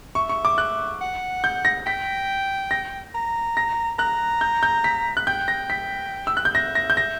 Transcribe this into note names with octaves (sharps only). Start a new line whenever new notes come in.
E5 C#6
C#6
D6
F#6
F#5
G6
A#6
G5 B6
A#6
A#5
A#6
A#5 F#6
G6
G6
B6
F#6
G5 G6
A#6
B6
E6
F#6
G6
E5 A#6
A#6
G6
A#6